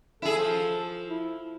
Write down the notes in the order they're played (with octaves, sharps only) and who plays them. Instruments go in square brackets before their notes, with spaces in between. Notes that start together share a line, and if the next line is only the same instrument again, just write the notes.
[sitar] E4 G#4 [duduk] A4
[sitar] F3
[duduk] E4